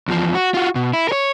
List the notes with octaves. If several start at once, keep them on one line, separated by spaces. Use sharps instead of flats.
E2 F3
F#4
F4 F#4
B2
E4
A#4 C#5